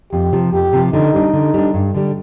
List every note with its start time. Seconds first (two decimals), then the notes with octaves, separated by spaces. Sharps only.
0.12 F2 G4
0.33 C3 F3
0.53 F2 G4
0.73 C3 F3
0.93 D3 D#4
1.14 G3 D4
1.33 D3
1.54 G3 D4
1.74 G2
1.95 D3 G3